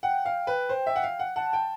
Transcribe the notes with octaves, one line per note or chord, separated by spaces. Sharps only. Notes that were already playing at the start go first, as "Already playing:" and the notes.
F#5 G5
F5
B4
C5
E5
F#5
F5
F#5
F#5 A5
G5